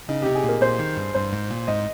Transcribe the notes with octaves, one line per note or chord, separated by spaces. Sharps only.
C#3 D#4
C3 G4
G#4
A#2 A#4
A#2 C5
D#3
G2
G2 C5
G#2
A#2
G#2 D#5